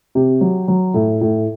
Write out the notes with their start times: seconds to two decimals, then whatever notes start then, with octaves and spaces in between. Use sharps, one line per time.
0.15 C3 G4
0.41 F#3
0.68 F#3
0.94 A2
1.21 A2